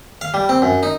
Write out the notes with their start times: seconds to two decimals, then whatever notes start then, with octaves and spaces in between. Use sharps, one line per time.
0.21 F5
0.34 G3
0.49 C4
0.62 F#2
0.83 D#4